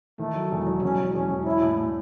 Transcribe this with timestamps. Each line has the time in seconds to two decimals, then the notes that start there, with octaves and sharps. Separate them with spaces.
0.19 D#3 A3
0.35 F#3
0.51 E1
0.67 F#3
0.82 E1 C#4
0.98 E1
1.14 E1 C#4
1.30 E1
1.45 C#4 E4
1.62 A2
1.77 A2